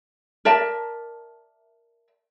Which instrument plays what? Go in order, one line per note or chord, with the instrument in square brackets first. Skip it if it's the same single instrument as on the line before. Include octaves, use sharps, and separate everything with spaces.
[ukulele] A#4 D5 E5 A5